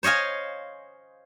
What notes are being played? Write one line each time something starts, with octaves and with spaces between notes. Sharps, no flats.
C5 C#5 D#5 F5 G#5